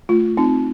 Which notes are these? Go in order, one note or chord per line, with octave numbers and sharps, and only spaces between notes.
A3 F4
C4 D#4